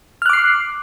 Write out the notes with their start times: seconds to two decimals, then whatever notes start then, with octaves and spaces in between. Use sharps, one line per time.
0.22 F6
0.26 F#6
0.29 D6
0.33 C7